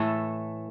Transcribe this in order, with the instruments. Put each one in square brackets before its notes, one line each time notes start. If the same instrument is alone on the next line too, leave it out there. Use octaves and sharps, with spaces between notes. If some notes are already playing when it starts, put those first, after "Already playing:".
Already playing: [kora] A2 E3 A3 A4